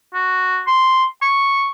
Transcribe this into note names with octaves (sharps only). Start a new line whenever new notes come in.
F#4
C6
C#6